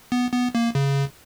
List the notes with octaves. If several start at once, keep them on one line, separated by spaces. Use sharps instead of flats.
B3
B3
A#3
C#3